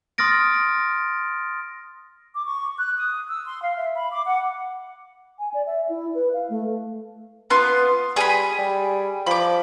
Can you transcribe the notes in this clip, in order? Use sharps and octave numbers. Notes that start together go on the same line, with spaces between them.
C6 D#6 F6 A6 A#6 D7
D6
C#6
F#6
D#6
E6
C6
F5
E5
B5
D6
F#5
G#5
D5
E5
E4
B4
F5
A3
B3 F4 C6
G3 G#4 G#5 B5
G3
F3 B5 D6